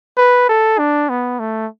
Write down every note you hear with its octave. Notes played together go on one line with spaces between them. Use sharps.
B4
A4
D4
B3
A3